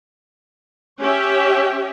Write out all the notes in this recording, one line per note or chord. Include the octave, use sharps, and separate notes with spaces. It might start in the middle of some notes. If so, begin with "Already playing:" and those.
C#4 G4 C#5 E5